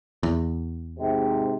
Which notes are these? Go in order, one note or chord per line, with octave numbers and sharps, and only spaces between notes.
E2
G#2 C3